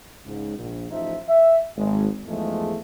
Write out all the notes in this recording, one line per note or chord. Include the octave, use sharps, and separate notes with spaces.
C#2 G#2
A#1
A1 F3 D#4 C5 E5
E5
G#1 G#3
E2 G#2 F3 G#3 A3